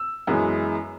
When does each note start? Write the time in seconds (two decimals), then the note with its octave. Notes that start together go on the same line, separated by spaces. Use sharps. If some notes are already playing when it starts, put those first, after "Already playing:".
Already playing: E6
0.27 F#2 E3 G#3 B3